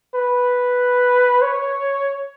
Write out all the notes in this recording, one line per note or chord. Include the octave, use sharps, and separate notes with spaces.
B4
C#5